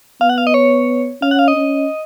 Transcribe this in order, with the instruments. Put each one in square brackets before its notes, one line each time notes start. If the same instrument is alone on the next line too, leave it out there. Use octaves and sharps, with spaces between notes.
[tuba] B3 [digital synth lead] F5
[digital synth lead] F#5
F5
D#5
C#5
[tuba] C#4 [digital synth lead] F5
[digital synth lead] F#5
F5
D#5
[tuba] C#4